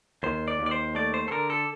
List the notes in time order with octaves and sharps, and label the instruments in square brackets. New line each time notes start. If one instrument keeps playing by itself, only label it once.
[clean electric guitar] D#2 C5
D5
D#2
D5
C5
A3 D5
C5
A4
D3 A#4
A4